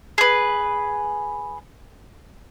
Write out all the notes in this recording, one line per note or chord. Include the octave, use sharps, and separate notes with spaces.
G#4 B4